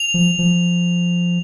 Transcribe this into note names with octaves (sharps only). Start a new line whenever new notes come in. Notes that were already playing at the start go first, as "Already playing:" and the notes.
Already playing: F7
F3
F3